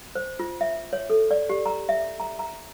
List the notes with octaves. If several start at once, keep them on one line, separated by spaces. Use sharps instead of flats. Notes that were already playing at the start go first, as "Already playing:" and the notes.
C5
F4
E5
C#5
A4
D5
G4
A#5
E5
A#5
A#5